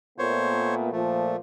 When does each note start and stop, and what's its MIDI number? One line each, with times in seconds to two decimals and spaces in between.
0.19 0.89 46
0.19 0.89 57
0.19 0.89 59
0.19 0.75 72
0.19 0.75 73
0.92 1.37 46
0.92 1.37 53
0.92 1.36 57